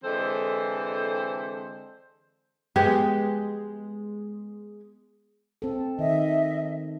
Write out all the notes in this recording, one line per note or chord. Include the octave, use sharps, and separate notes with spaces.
D3 E3 G#3 C4 A4 C5
G#3 B3 G4 G#4
C4 A4
D#3 D#5 E5